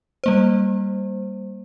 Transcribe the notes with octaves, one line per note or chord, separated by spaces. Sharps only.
G3 A#3 C5